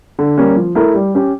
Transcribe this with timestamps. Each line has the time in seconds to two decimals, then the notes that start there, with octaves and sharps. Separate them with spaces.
0.19 D3
0.38 G3 A#3 C#4
0.56 F3
0.75 A3 E4 A#4
0.95 G3
1.15 C#4 G4